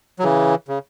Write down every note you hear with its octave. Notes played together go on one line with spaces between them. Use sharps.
F#3
C#3 E3
C#3